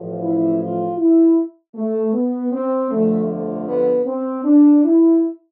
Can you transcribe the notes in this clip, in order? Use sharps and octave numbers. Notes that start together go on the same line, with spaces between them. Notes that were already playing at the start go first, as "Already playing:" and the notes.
Already playing: A1 A2 F3
E4
F4
E4
A3
B3
C4
G1 F2 D3 F3 A3
A3
B3
C4
D4
E4